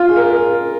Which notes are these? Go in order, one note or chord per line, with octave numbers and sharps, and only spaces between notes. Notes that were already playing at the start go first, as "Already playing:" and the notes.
Already playing: F4
G#4
A#4
G#4
A#4